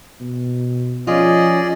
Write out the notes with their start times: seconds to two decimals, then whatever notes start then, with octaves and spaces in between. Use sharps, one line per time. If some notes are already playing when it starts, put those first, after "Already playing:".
0.20 B2
1.07 F3 C#4 F4 G#4 D5 D#5